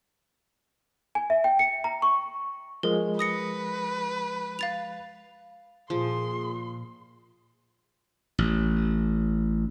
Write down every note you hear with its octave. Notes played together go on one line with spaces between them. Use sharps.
G#5
E5
G5
C#7
A#5
C#6
F3 G#3 A#4
B4 D#6 A#6 C#7
F5 A6 F7
A#2 F3 G#4 C6
A1